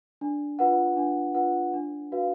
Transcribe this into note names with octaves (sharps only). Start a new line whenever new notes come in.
D4
F4 B4 F#5
D4
F4 B4 F#5
D4
F#4 B4 F5